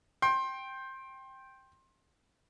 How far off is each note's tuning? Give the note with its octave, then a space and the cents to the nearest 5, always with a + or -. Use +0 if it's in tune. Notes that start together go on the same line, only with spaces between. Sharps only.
G5 +0 C6 +25